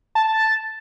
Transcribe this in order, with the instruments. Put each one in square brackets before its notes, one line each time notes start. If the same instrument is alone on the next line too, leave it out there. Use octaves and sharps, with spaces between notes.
[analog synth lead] A5